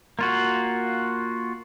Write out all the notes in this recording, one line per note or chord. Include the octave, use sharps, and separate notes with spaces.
A#3 F4 F#4